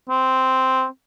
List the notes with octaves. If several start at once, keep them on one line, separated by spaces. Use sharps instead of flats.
C4